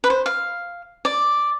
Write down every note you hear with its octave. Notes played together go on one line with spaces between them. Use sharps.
B4
C5
F5
D5